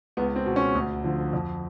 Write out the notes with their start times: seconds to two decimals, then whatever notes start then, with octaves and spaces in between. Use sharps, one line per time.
0.17 C#2 B3
0.36 C4
0.46 B2
0.56 C#4
0.75 D2
1.04 D3 F3
1.33 F2